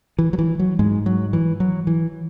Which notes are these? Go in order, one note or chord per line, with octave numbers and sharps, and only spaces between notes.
E3
F#3
E3
F#3
G#2 G#3
F#3
E3
F#3
E3